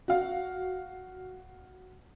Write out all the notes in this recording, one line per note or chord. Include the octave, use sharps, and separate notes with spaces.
F#4 F5